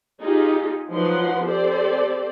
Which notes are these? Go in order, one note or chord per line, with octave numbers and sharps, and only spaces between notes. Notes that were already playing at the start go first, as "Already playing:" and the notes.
D#4 F4 G4 G#4
F3 F#3 D#4 B4 F#5 C6
C4 G4 A4 C5 D5